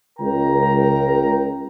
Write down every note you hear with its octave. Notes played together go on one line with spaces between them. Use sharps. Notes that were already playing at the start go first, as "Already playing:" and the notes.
C#2 A#4 G5 A#5